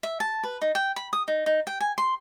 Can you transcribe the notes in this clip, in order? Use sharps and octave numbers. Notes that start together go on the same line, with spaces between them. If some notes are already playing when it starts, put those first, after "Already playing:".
E5
A5
B4
D#4
G5
B5
D#6
D#4
D#4
G5
G#5
C6